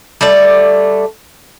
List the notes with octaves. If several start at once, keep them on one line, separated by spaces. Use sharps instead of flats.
G3 A3 D5